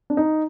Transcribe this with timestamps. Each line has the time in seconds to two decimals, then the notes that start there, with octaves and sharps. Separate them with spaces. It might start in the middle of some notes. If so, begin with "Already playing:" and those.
0.10 D4
0.17 D#4